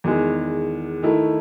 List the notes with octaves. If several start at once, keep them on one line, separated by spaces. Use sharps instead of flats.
E2 D#3 G#3
D#3 A3 E4